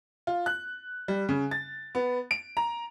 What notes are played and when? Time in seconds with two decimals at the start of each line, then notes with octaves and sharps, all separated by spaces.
0.27 F4
0.46 F#6
1.08 G3
1.29 C#3
1.51 A6
1.95 B3
2.31 D7
2.57 A#5